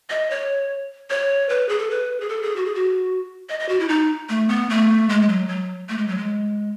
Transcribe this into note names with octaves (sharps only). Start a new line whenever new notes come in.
D#5
C#5
C#5
B4
G#4
A4
B4
G#4
A4
G#4
F#4
G#4
F#4
D#5
D#5
F#4
E4
D#4
A3
B3
A3
G#3
F#3
F#3
A3
G#3
F#3
G#3